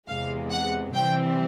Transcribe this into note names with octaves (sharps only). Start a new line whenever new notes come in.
E2 C3 E3 G#3 F5
F#5
C3 E3 G3 C4 G5